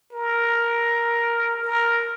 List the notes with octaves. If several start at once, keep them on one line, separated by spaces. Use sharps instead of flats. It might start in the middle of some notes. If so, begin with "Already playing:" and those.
A#4
A#4